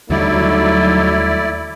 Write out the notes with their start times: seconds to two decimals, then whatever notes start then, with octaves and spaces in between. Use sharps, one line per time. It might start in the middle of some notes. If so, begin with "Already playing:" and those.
0.10 D#2 D3 F#3 G3 A3 D#4 E4 D5